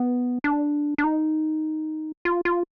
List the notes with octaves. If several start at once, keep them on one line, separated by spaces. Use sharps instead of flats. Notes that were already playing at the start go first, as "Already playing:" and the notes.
Already playing: B3
D4
D4
D#4
F4
F4